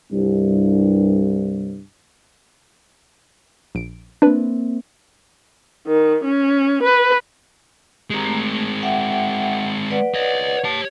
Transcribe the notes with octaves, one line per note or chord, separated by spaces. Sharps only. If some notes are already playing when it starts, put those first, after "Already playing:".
C2 G2
A#1 D7
A#3 C4 D4 B4
D#3
C#4
B4
G#3 C4 G4 A#5
A3
E5 F#5 G5
B4 D5 F#5
C#5 D#5
G4 C#5 A5